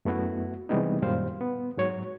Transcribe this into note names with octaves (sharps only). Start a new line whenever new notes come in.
F#2 A3 B3 E4 F#4
C3 E3 G3 G#3 B3 D#4
F#2 A#2 D#3 G3 C5 F5
B3
G#2 F#3 C#5